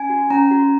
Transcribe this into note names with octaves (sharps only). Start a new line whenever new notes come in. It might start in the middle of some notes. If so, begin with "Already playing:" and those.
Already playing: C#4 G#5
F#4
C#4 A#5
F#4